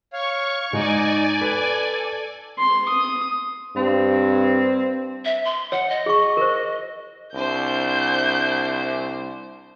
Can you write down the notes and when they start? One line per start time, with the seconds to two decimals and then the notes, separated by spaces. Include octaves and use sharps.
0.13 C#5 F5 C#6
0.73 G#2 D#4 D5 G#5
1.42 A4 B4
2.59 C6
2.89 D#6
3.77 G2 C4
5.25 E5
5.45 C6
5.72 C#5 F#5
5.89 D#5
6.06 G#4 C#6
6.37 A#4 C5
7.34 C2 D4 C5 G6